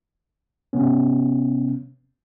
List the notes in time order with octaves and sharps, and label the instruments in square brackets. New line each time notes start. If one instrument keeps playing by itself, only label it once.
[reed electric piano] C3 B3 C#4